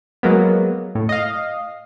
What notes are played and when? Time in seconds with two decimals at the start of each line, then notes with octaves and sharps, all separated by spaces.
0.23 F#3 G#3 A#3 B3
0.95 A2
1.09 D#5 F5